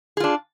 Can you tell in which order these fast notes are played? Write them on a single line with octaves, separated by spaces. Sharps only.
G#4 F4 D4